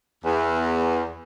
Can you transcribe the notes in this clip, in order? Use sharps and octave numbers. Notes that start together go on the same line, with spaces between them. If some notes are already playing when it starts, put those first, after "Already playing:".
E2